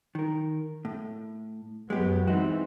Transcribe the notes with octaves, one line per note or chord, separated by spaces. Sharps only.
D#3 A#4
A2
F#2 F#3 G#3 B3 G4
E3 G#3 C4 D#4 F#4